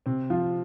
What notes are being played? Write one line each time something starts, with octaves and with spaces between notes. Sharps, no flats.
C3 C4
F3 F4